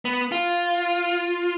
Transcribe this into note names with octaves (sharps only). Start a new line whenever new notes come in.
B3
F4